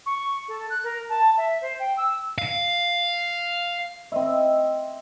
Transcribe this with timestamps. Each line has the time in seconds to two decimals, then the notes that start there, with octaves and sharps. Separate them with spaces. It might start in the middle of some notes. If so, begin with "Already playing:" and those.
0.06 C#6
0.48 A4
0.70 F#6
0.84 A#4
1.09 A5
1.37 E5
1.62 C5
1.79 G5
1.97 E6
2.38 F5
4.12 C4 D#5 E5